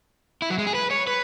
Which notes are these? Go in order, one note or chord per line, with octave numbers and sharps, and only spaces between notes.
E4
F#3
G#3
G#4
B4
C#5
B4